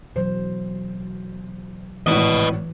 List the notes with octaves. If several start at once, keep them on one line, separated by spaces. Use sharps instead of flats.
B2 E3 F#3 C5
G#1 A2 E3 B4 D#5